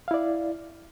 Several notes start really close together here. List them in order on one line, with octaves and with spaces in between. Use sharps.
F5 E4 D5